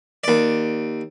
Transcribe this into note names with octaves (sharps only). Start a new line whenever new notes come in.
D#2 D5